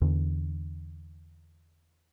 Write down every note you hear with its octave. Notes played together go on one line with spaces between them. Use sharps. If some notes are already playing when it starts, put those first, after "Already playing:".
E2 D3